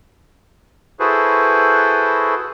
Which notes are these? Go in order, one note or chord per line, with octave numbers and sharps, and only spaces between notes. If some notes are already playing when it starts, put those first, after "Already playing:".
E4 F#4 G#4 A4 B4 C5